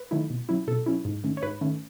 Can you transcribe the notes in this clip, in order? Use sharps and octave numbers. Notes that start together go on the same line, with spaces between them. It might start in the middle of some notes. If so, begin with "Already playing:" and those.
Already playing: B4
D#3 F#3 A3 E4
B2
F#3 C#4 E4
B2 A4
F#3 C#4 E4
G#2
D#3 A3 C#4
C#5
G#2 B4
D#3 A3 C#4